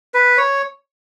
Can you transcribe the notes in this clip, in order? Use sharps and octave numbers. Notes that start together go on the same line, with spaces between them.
B4
C#5